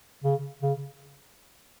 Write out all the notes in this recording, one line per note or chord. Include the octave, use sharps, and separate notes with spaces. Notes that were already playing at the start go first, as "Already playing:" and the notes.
C#3
C#3